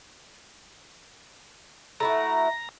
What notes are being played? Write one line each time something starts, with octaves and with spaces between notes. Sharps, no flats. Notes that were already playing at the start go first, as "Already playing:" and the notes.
A3 E4 F#4 A#5